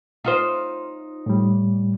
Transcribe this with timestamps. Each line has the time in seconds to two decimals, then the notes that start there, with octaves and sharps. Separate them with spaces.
0.24 D#4 F4 C5
1.26 A2 G3